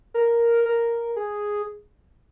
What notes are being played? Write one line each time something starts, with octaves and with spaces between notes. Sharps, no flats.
A#4
A#4
G#4